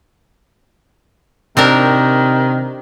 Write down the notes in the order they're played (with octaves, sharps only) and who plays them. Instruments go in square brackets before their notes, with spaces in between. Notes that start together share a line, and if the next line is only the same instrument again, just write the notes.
[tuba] C3 [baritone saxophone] D#3 [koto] C4 D4 A#4